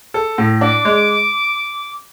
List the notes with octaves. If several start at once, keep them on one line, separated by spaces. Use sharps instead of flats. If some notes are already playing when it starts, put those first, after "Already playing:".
A4
A2
D4 D6
G#3